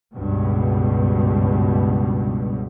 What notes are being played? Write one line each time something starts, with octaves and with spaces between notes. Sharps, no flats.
C#2 G2 B2